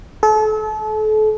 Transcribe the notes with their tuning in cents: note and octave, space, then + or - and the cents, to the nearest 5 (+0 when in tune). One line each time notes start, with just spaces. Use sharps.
A4 -35